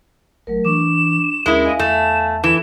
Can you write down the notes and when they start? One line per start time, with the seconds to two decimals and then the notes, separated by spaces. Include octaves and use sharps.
0.47 G#1 F#3 A3 A#4
0.65 E3 D4 C#6 D6 E7
1.46 D#2 G#3 C#4 E4 G#4 A#4
1.65 D#5 F5 G#5
1.79 E2 A3 E7
2.44 E3 A4 E7